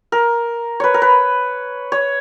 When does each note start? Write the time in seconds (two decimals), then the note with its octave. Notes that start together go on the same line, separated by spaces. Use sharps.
0.12 A#4
0.80 B4 C#5
0.94 A#4
1.02 B4
1.92 C#5